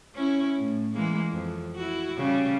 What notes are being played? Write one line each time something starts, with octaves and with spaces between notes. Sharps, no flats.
C#4 E4
A2
E3 G#3 A#3
F2
E4 F#4
C#3 G3